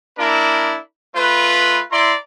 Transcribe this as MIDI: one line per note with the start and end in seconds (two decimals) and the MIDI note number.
0.18 0.76 58
0.18 0.76 62
0.18 0.76 64
0.18 0.76 70
1.15 1.81 57
1.15 1.81 65
1.15 1.81 71
1.91 2.14 64
1.91 2.14 74
1.91 2.14 82
1.91 2.14 84